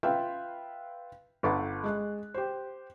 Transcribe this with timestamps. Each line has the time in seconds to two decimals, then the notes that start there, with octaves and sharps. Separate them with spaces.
0.03 F4 B4 E5 F5 G5
1.43 G1 A4 B4 F#5 A5 D6
1.84 G#3 F#6
2.34 G4 C5